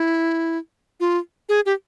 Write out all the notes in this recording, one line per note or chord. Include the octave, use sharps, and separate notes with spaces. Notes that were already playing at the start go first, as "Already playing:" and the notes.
Already playing: E4
F4
G#4
G4